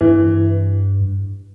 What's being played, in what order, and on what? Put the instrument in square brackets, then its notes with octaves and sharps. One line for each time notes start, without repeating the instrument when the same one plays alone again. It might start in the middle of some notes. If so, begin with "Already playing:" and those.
[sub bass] G2 [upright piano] E3